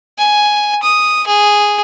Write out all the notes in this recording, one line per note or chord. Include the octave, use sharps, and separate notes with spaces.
G#5
D#6
G#4